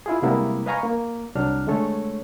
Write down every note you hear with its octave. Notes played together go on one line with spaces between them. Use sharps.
E4 F4 G#4
C3 G3 G#3 A#3 B3 E4
B4 D#5 F5 G#5 A#5 C#6
A#3
C2 F#3 D4 F6
D3 G#3 A3 A4 C#5